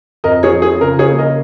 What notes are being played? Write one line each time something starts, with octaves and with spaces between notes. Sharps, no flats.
F2 A#4 D#5
G#4 C#5
F3
G#4
C#3 A#4
G#4 C#5
A#3
A#4 D#5